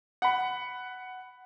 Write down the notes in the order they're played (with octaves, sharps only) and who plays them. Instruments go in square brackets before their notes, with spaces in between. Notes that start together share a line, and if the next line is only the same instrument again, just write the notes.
[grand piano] F#5 B5